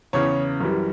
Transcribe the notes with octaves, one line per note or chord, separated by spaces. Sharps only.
E2 C#3 E3 C#5
F#2 E3 G3